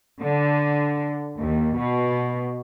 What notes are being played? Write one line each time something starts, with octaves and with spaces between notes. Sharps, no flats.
D3
D#2
B2